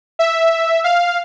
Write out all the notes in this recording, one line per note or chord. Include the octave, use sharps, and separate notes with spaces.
E5
F5